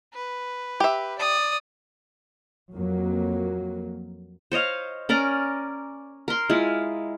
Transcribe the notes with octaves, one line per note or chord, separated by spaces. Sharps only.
B4
G4 E5
D5 D#6
F2 F#3 A#3
C5 C#5 D#5 F5
C#4 A#4 D5 A#5
A#4 C6
G#3 E4 F4